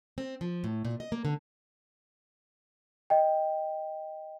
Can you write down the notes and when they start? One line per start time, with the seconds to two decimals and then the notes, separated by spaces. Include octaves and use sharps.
0.18 C4
0.41 F3
0.64 A2
0.85 A#2
1.00 D#5
1.12 A#3
1.25 D3
3.10 D#5 G5